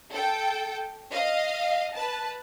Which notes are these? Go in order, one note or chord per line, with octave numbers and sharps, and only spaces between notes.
A4 G5
D#5 F5
B4 A5